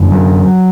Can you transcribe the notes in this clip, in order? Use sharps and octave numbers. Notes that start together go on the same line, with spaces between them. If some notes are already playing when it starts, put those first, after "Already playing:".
Already playing: F#2 D3
F#3